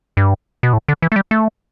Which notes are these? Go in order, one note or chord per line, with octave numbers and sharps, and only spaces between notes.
G2
B2
A2
D3
E3
A3
G3
A3